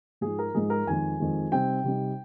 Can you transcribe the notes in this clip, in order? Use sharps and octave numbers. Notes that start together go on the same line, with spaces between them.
G#2 F3 G#3 D#4 G#4
A#4
G#2 F3 G#3 D#4 G#4
A#4
F2 D#3 G#3 G#5
F2 D#3 G#3
C3 G3 C4 D#4 G5
C3 G3 C4 D#4